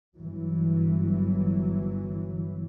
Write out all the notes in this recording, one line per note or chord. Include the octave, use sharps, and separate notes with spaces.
G1 E3 F#3